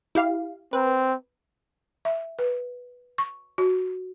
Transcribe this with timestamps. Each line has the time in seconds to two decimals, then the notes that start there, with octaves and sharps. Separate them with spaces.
0.15 E4 G4 F5
0.73 C4 B4
2.05 E5
2.39 B4
3.18 C#6
3.58 F#4